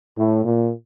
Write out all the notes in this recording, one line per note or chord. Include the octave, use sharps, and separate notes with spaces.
A2
A#2